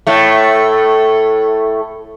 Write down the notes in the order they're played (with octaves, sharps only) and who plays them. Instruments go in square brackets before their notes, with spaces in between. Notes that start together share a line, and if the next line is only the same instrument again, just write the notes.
[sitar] A2 A3